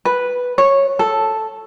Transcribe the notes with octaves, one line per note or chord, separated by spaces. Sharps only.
B4
C#5
A4